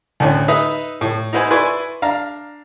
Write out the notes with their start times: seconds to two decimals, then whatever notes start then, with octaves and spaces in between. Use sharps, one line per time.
0.20 D2 A2 C#4
0.48 D#4 B4 E5 D#6
1.01 A2
1.33 D#4 E4 F#4 B4 C5 G#5
1.51 E4 B4 D5 G#5 C6 C#6
2.02 D4 F5 A#5